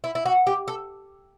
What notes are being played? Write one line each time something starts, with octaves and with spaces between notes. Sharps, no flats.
E4
E4
F#4
G4
A4